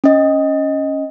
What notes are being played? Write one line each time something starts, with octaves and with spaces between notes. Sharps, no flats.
C#4 D#5